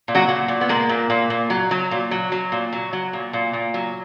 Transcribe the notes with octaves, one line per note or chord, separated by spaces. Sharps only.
A#2
F#3 F#4
A#2
A#2
B3
G#3 A#3
A#2
A#2
A#2
F#3
F#3
A#2
F#3
F#3
A#2
F#3
F#3
A#2
A#2
A#2
F#3